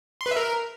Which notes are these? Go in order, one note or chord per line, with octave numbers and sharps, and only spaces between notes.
C6
B4
E5
A#4